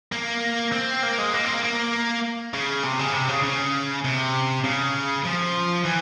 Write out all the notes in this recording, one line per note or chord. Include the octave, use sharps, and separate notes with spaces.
A#3
C4
A#3
G#3
A#3
C4
A#3
A#3
C#3
C3
C#3
C3
C#3
C#3
C3
C#3
F3
E3